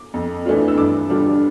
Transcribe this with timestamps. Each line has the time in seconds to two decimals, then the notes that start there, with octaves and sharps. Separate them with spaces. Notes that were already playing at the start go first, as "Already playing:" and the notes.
Already playing: D6
0.14 F2
0.46 E3 A3 D4 F4
0.68 E6
0.77 G2 D6
1.09 D3 G3 D4 F4